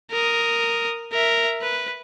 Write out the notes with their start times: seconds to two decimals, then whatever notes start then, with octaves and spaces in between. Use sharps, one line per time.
0.11 A#4 D#6
1.12 A#4 E5
1.62 B4